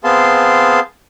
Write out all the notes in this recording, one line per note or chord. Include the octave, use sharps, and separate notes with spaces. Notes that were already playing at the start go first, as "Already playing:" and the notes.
B3 C4 G#4 F5 A5 C6